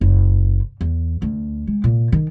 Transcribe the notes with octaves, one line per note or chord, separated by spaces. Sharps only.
F#1
E2
D2
G#3
A#2
D#3